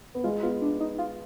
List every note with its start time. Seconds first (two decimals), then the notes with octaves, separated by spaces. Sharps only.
0.15 B3
0.24 G#3 F4
0.43 B3 F4
0.62 D4
0.80 D#4
0.98 F4